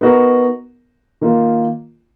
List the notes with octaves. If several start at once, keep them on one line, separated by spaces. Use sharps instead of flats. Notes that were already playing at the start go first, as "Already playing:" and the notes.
B3 D#4 F#4 A#4
D#3 A#3 F4